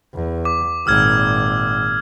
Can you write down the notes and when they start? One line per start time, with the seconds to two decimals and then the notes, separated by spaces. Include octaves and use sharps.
0.14 E2
0.45 D6
0.87 G#1 A#2 E6 F6 G#6